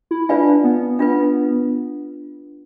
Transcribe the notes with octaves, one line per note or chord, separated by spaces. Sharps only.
E4
D4 F4 B4 D5 F5 G#5
B3
B3 D4 F4 B4